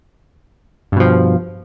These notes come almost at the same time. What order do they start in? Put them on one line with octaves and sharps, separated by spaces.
G2 B2 F3